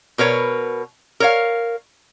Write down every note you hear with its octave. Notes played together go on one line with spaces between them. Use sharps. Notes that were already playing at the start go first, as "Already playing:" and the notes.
B2 A#4 B4 C#5
A#4 C#5 F5